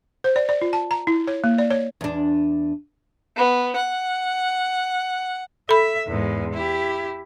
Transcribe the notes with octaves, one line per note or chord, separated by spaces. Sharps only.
C5
D5
D5
F4
A5
A#5
E4
C#5
A#3
D5
C#5
E2 D4
B3
F#5
A4 E5 B5
E2 G#2
E4 G4